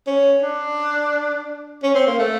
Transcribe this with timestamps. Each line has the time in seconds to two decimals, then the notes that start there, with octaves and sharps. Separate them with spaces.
0.07 C#4
0.42 D4
1.83 C#4
1.95 C4
2.07 A#3
2.19 A3